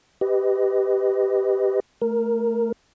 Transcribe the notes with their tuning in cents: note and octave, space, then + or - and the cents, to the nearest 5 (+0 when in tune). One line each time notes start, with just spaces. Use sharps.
G4 +0 B4 +20 D#5 +0
A3 +0 A#4 +0